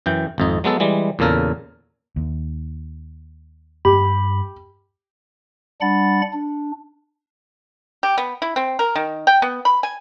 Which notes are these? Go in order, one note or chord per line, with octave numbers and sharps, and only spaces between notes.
F#2 E3 G5
G#1 F2 D#4
F#3 G#3 B3 A4
E3 G3 G#3
E2 A#2 C#3 A4 A#4
D#2
G2 G4 B5
G3 D4 F#5 B5 A6
D4
G4
B3
E4
C4
A#4
D#3
G5
B3
B5
G#5